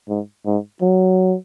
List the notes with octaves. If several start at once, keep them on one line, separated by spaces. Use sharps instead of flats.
G#2
G#2
F#3